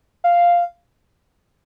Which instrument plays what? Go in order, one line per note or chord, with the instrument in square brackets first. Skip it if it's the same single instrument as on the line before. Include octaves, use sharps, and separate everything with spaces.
[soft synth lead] F5